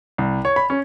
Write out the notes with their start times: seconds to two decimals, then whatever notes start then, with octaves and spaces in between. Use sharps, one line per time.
0.18 C2
0.45 C#5
0.56 B5
0.70 C#4